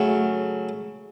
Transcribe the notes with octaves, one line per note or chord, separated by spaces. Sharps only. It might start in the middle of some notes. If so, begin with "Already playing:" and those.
Already playing: C#3 F#3 A3